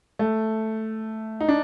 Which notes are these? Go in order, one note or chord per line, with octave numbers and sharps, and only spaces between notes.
A3
D#4
D4